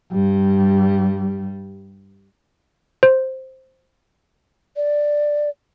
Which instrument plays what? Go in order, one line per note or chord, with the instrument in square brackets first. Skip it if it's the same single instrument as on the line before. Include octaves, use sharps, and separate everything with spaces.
[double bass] G2 G3
[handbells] C5
[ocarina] D5